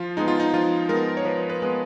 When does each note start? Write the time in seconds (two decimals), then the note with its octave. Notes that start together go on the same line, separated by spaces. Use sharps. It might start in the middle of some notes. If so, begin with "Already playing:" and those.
Already playing: F3 F4
0.17 G#3 B3 D#4
0.28 F4
0.40 D#4
0.54 F3 F4
0.89 G#3 B3 A#4
1.17 C#5
1.25 F3 B4
1.50 B4
1.62 G#3 B3